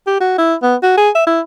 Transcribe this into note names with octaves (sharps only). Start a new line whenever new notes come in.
G4
F#4
E4
B3
F#4
G#4
E5
E4